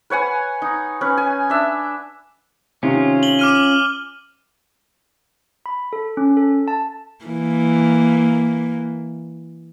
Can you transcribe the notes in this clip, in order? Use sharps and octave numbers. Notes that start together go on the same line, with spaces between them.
B4 C#5 F#5 G#5
D#4
C#4 B4
G#5
D4 E5
C3 D#3 C#4 F4
F#7 G7
D6 F6 D#7
B5
A4
C#4
A4
A5
E3 A#3